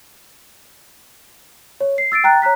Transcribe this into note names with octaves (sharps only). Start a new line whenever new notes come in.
C#5
C7
E6 A6 C7 D7
G5 A#5 F#6 A6
C#5 A#5 F#6 B6